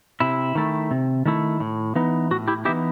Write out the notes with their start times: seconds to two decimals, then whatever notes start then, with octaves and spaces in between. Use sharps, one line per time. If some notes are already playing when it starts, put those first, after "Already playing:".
0.20 C3 E4
0.55 D#3 A3 E4
0.91 C3
1.26 D#3 A3 E4
1.60 A2
1.95 E3 B3 D#4
2.31 A2 F#4
2.48 E4 G4
2.65 E3 B3 D#4 E4 G4